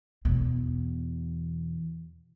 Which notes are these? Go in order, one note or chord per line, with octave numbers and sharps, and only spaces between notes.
E2 B2